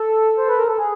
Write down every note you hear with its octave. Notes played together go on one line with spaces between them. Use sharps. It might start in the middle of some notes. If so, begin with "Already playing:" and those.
Already playing: A4
C5
B4
A#4
A4
G#4